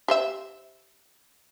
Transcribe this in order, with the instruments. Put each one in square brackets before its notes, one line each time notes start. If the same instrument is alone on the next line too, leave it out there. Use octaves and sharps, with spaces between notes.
[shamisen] G4 C5 E5